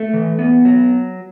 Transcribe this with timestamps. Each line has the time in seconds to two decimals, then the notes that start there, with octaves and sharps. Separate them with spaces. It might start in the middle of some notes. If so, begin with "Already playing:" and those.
Already playing: A3
0.14 E3
0.39 B3
0.65 F#3